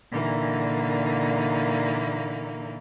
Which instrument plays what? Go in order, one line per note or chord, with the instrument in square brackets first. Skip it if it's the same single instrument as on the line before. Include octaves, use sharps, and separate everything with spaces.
[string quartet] A#2 D3 E3 A#3 D#4